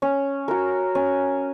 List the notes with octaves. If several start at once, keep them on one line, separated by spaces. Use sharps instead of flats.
C#4
F#4 A#4
C#4